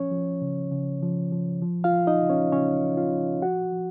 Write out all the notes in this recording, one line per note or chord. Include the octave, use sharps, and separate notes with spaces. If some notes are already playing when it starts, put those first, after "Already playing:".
Already playing: F3 C#4 C#5
F3
C#3
C#3
F3
F3
F3
F4 F5
F3
D#4 D#5
C#3
C#4 C#5
C#3 C#4 C#5
F3
F4 F5
F3
F3 F#4 F#5
F3